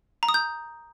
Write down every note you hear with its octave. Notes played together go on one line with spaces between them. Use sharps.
A#5
D#6
G6